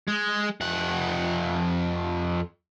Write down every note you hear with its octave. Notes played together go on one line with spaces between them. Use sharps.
G#3
F2 F#5